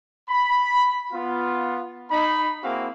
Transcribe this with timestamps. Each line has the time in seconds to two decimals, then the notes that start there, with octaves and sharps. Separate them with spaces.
0.30 B5
1.12 B3 F4
2.11 D#4 B5
2.63 A#3 C4 E4 F#4 G#4 F5